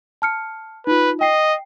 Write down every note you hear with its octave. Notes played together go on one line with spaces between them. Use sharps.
A5 F6 C#7
D#4 F4 B4
D#5 G5 C7